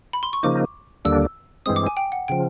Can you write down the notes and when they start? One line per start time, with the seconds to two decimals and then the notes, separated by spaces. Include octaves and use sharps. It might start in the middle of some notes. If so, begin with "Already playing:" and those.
0.13 B5
0.23 C6
0.33 C#6
0.43 C#3 F3 A#3 D#4 D6
1.05 D#2 D3 G3 A#3 D4 E6
1.66 G2 E3 G#3 C4 D#6
1.76 D6
1.87 G#5
1.97 G5
2.12 F#5
2.28 C#3 F3 G5